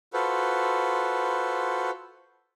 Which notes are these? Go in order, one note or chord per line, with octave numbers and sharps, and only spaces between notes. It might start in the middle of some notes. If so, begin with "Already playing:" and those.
F4 F#4 A4 B4 C5